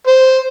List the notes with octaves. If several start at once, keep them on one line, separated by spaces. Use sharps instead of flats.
C5